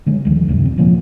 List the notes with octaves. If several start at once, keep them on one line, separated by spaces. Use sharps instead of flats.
D3 G3 G#3
D#1 D#2 F3
D#1 C#2 F#2 C3
E1 C4
A#2 D3 F3 A#3